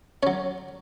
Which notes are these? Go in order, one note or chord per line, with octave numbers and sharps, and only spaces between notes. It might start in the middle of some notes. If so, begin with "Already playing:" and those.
F#3 C#4 C#5